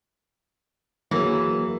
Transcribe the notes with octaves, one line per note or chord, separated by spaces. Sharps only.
E3 F#3 A#3 G#4